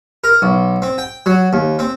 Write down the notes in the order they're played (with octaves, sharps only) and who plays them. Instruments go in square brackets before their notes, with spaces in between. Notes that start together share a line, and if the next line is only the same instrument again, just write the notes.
[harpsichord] A#4
B1
C4
G5
F#3
D#2
C4